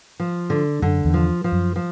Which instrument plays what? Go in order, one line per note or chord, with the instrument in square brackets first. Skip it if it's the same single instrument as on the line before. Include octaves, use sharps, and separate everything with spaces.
[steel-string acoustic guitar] F3
D3
[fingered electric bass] F#2 [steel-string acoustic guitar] D3
[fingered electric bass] E2
[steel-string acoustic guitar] F3
F3
[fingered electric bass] F#2
[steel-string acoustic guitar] F3